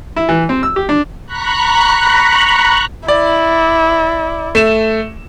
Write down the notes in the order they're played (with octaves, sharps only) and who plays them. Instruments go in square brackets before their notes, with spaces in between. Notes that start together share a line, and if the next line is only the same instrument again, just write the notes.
[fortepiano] E4
E3
C4
E6
G4
D4
[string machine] A#5 B5 C#6 F#6
[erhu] E4 [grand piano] D5
[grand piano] A3 E7